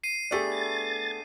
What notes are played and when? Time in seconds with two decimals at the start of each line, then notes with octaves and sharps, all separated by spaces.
0.04 C7 D#7
0.31 A3 B3 D4 G4 G#4
0.52 A6